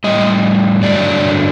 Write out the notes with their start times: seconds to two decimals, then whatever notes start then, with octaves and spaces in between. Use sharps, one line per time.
0.04 A2 G3 D#5
0.83 G2 D3 F#3 D5